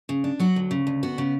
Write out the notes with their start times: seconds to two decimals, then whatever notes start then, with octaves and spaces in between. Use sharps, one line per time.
0.09 C#3
0.24 D4
0.39 F#3 F#4
0.56 D2
0.71 C#3
0.87 D2
1.03 B3 F#4
1.18 C#3